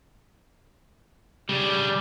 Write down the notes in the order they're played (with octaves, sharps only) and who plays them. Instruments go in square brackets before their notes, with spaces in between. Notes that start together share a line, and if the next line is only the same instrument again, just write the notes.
[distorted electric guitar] C#3 D4 [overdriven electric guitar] G3